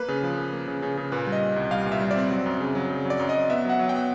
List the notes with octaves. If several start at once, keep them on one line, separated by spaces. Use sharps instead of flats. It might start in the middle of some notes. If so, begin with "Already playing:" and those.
Already playing: A#3 B4
C#3
F3
A#3
A#3
C#3
C#3
C#3
A#2 B4
G3
D#5
A#2
C2
G3 F5
A#2
E5
G3
C4 D5
F#3
F#2
C#3
F#3
C#3
F#3
D5
F#2
D#5
F#2
B3 E5
F#3 F#5
F#3
B3 G5